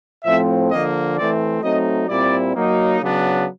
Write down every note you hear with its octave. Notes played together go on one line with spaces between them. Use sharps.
A2 F3 A3 C4 E5
D3 F3 A#3 D#5
E3 A3 C4 D5
F#3 A3 C4 D#4 D#5
A#2 G3 C4 E4 D5
F#3 A#3 D#4
C#3 F#3 B3 D4